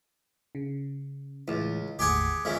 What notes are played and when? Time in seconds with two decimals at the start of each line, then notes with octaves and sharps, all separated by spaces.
0.55 C#3
1.48 C#2 A2 E3
1.99 G1 D#2 A2 G4 G#4 F#5
2.45 F2 C#3 E3 G#3